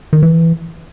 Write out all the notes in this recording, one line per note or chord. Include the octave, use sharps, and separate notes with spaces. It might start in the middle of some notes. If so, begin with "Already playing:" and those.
D#3
E3